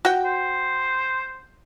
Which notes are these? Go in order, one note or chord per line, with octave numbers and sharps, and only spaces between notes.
F#4 G5
C5